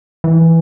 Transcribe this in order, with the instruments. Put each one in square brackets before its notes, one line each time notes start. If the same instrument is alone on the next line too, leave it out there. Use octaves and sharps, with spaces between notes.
[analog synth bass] E3